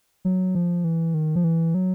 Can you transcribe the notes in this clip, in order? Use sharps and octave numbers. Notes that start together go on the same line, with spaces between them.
F#3
F3
E3
D#3
F3
E3
F#3